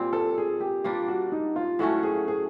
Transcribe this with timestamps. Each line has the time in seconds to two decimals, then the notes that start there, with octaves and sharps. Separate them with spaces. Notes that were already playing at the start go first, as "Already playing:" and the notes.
Already playing: A#2 G3 C4
0.13 A4
0.38 G#4
0.61 G4
0.84 G3 A#3 D4 F4
1.08 F#4
1.32 D#4
1.56 F4
1.79 A2 F#3 A3 C#4 F#4
2.03 G#4
2.28 G#4